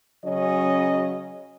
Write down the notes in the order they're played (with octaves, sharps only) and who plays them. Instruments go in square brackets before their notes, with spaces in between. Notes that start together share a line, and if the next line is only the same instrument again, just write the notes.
[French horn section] C#3 F#3 C#4 D#5